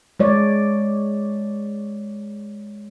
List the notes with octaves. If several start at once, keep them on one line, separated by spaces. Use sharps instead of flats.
G#3 C#5 D5